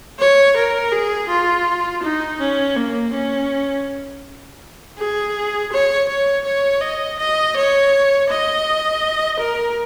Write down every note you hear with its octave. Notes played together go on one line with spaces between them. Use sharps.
C#5
A#4
G#4
F4
D#4
C#4
A#3
C#4
G#4
C#5
C#5
C#5
D#5
D#5
C#5
D#5
A#4